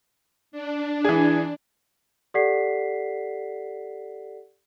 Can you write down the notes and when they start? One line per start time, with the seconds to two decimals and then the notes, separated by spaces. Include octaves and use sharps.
0.52 D4
1.05 E3 G#4
2.34 G4 A4 D5 F#5 B6 C7